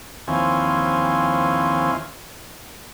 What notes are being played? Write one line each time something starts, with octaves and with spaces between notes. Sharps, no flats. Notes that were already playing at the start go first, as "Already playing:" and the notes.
D#2 E3 F3 C4 C#4 G#5